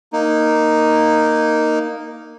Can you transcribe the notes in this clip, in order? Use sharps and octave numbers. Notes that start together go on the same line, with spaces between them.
A#3 D#4